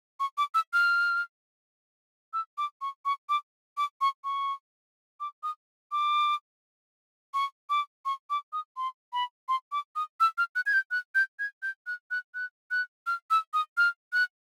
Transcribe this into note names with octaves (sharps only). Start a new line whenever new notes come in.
C#6
D6
E6
F6
E6
D6
C#6
C#6
D6
D6
C#6
C#6
D6
D#6
D6
C#6
D6
C#6
D6
D#6
C6
B5
C6
D6
D#6
E6
F6
F#6
G#6
G6
F#6
G6
G#6
G6
F#6
F#6
F#6
F#6
F6
E6
D#6
F6
F#6